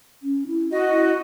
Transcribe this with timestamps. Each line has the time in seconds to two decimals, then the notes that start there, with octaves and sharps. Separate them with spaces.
0.23 C#4
0.47 E4
0.71 F#4 D#5
0.89 E4